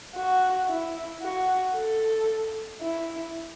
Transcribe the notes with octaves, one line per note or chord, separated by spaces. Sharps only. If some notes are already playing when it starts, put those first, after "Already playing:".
F#4
E4
F#4
A4
E4